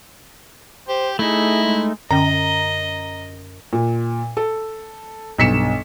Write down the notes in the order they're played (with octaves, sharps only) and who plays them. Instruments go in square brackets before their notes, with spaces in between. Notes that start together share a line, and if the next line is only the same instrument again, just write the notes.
[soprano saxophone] G4 [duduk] C5
[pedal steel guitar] A3 D#4 [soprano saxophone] E4 [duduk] G#4
[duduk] G#3
[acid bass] F#2 [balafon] D3 C#4 G5 [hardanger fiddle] D#5 [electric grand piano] A#5
[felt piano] A#2
A4
B1 G2 B6 C#7 E7